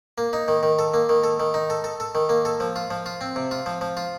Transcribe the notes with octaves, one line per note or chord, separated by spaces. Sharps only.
A#3
D#4
D#3
D#3
A4
A#3
D#3
A4
D#3
D#4
A4
A4
A4
D#3
A#3
A4
F3
F4
F3
F4
C4
C3
F4
F3
F3
F4